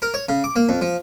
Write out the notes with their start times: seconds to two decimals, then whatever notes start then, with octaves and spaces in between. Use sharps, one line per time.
0.02 A#4
0.14 C#5
0.29 C#3
0.44 D6
0.56 A#3
0.69 F2
0.81 F3